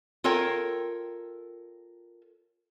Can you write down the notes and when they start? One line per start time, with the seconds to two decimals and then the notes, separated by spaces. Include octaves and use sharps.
0.24 F4 A4 A#4 C#5 G5